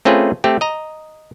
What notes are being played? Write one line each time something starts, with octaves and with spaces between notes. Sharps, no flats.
A3 C4 C#4 F4 G#4 B4
A3 C4 G4
D#5 A#5